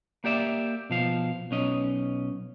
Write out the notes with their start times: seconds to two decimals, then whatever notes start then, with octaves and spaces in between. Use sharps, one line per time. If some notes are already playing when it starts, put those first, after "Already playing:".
0.24 A#3 G4 D5 E5
0.90 B2 F3 F5
1.51 B1 C#4 D#5